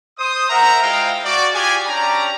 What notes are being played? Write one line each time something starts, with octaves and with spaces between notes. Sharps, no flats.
C5 D#6
A#4 E5 F#5 A#5
G#3 E4 F4 C5 F5 G5
F#4 D5
F4 G4 G#4 G#5
C#4 D4 G4 D5 A#5